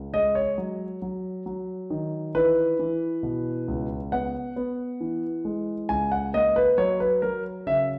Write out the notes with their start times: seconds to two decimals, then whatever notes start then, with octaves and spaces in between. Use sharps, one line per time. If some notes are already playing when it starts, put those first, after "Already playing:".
Already playing: C#2
0.14 G#3 D#5
0.35 C#5
0.58 F#3
1.02 F#3
1.46 F#3
1.90 D#3
2.35 E3 B4
2.79 E3
3.23 B2
3.68 C#2
4.12 B3 F#5
4.56 B3
5.00 E3
5.45 G#3
5.89 C#2 G#5
6.12 F#5
6.34 A#3 D#5
6.56 B4
6.78 F#3 C#5
7.00 B4
7.22 F#3 A#4
7.67 C#3 E5